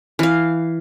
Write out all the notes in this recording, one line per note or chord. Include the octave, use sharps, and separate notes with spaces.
E3 F5